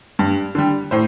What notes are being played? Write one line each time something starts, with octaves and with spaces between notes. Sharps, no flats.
G2
D3 G3
A2 C5